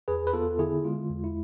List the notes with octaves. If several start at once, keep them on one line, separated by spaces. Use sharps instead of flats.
E2 G#4 B4
B4
B3 F4 A4
D3 E4 G#4
G#3 F4
E2
E4